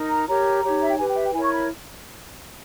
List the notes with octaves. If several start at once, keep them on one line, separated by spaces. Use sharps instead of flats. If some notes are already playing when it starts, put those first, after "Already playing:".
Already playing: D#4 A#4
A#5
G4 A#4 C#5 A#5
D#4 G4 C#5
E5
G5
G4 B4 G#5
G5
E5
G5
E4 A#4 C#5 G#5
C#6
B5